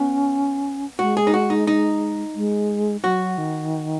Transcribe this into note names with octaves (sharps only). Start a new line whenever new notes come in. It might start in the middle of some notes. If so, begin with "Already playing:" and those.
Already playing: B3 C#4
G#3 F#4
G#4
D#4
F#4
D#4
D#4
G#3
F#3 F#4
D#3